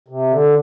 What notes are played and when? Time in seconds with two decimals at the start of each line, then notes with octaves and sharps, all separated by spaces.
0.08 C3
0.31 D3